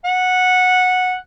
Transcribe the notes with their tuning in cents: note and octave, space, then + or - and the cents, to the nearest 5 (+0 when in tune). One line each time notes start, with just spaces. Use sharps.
F#5 -10